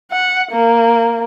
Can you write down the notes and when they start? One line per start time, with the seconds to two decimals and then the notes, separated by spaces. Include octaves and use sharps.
0.11 F#5
0.52 A#3